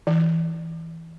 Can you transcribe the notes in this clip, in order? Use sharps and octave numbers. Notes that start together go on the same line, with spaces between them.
E3